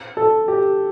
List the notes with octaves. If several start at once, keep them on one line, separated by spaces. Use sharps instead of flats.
A4
G4